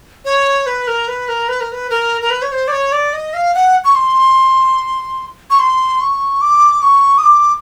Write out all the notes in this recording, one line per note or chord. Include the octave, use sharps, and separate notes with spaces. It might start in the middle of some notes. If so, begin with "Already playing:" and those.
C#5
B4
A#4
B4
A#4
B4
A#4
B4
A#4
A#4
B4
C#5
C5
D5
C#5
D5
D#5
F5
F#5
C#6
C6
C#6
C6
C#6
D6
C#6
D#6
D6